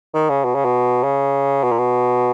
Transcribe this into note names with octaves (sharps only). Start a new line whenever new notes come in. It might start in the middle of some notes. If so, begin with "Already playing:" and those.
D#3
C#3
B2
C#3
B2
C#3
B2
A#2
B2